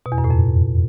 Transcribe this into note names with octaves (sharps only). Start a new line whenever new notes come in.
B2
E2
F#2
A2
F2